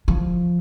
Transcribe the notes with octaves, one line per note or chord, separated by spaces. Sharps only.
F3